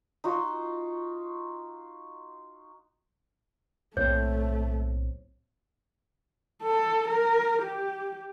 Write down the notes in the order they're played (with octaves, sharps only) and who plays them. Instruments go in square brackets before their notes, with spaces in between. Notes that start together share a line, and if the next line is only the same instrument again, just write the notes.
[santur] D#4 F4 F#4
[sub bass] B1 [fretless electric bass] A2 A#3 C4 [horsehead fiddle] A3 [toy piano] C#5
[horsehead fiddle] A4
A#4
G4